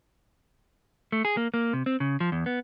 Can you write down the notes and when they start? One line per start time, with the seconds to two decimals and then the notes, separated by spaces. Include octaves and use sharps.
1.12 A3
1.25 G#4
1.37 A#3
1.54 A#3
1.73 C3
1.86 C4
2.00 C#3
2.20 F3
2.32 E2
2.46 B3